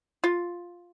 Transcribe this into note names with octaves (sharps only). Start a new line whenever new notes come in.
F4